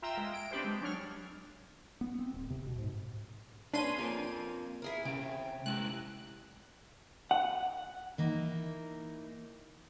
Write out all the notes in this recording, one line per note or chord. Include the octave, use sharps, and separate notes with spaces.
F4 E5 G5 A#5 E6
G#3
D7
C4 D4 G4 B4 C5
G#3
F#3 D4 C#5 F6
B3
C4
D1
C3
B2
G#2
A#3 C#4 D4 G#4 B4 C6 D#7
A#3 C4 F4
E4 G#4 A#4
C3 C#4 G5
G#3 E4 G4 F#6
F#5
E3 A#3 D#4